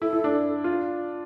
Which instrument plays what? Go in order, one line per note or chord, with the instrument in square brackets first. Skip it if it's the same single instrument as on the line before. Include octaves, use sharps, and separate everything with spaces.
[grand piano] E4 [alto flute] A4
[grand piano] E4
D4
F4